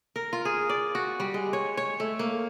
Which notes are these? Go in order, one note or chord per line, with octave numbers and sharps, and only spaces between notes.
A#4
F4
G#4
D5
F#4
G3
G#3
C#5
C#5
A3
A#3